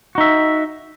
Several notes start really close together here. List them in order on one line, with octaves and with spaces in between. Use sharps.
F#4 D#4 E5